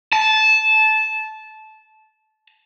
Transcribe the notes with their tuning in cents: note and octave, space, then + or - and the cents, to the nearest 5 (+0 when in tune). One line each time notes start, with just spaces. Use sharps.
A5 -15